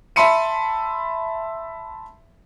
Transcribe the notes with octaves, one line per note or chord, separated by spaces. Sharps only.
E5 A5 B5 C6 C#7 D#7